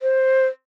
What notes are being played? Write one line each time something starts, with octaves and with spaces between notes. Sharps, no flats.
C5